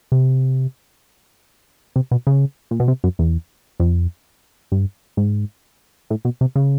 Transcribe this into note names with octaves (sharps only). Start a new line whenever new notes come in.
C3
C3
B2
C#3
A#2
B2
C3
F#2
E2
F2
G2
G#2
A2
B2
C3
C#3